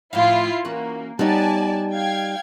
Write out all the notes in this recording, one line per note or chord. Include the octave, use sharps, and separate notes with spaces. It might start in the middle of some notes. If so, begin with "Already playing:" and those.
A2 F3 E4 F4 F5 C7
E3 A#3 C#4 F#4
G3 B3 D#4 C#5 D5 G#5 A5
F5 G5 G#6